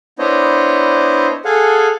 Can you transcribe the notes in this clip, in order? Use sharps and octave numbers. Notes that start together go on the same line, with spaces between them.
B3 D4 E4 C5 C#5 D#5
G#4 A4 F5 F#5 G#5